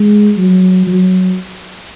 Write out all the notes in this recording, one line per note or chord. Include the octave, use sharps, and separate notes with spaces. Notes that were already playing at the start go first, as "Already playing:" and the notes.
Already playing: G#3
F#3
F#3